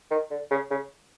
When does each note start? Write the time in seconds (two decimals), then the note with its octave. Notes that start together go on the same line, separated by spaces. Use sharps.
0.11 D#3
0.31 D3
0.51 C#3
0.70 C#3